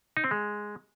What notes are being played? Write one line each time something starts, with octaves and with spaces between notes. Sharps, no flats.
D#4
C4
G#3